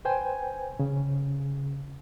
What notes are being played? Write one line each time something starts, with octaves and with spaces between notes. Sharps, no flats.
B4 C5 G5 G#5
C#3